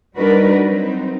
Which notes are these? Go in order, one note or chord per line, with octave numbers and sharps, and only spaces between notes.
G3 D4 D#4 F#4 A#4 B4
F#3 C4 D#4